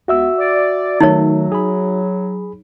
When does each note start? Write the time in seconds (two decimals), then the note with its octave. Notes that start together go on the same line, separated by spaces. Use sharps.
0.08 C#2 B3 F#4 E5 E6
0.39 D5
1.00 D#3 F#3 A3 D#4 C#5
1.52 G#4 B5